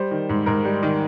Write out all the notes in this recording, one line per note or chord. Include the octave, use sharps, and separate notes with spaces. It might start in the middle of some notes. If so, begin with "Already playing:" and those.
Already playing: G3 C5
D#3
G#2
G#2 A#4
G3
D#3